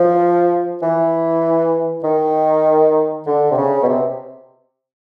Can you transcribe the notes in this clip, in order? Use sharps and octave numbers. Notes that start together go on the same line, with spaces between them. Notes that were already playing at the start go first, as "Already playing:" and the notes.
Already playing: F3
E3
D#3
D3
C3
C#3
B2
C3